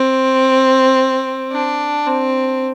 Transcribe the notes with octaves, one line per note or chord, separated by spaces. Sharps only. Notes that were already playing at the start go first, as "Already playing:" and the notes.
Already playing: C4
D4
C4